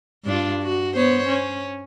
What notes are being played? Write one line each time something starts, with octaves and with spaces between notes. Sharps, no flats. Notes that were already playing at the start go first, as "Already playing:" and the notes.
G2 D4 F4
F#4
B3 C5 C#5
C#4